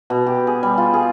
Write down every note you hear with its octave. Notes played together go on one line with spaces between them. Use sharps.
B2
G4
G#4
G3
F4
G#4